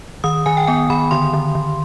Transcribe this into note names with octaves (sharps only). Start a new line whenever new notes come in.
D#3 D#6
D#3 G#5
G5
B3 G#5
D#3 B5
D3 C6
D3
D3